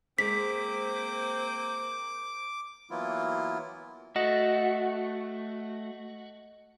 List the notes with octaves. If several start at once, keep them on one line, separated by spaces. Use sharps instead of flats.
G#3 A#3 C4 C5 D6 B6
E3 F#3 A#3 B3 E4 F4
A3 F#4 D#5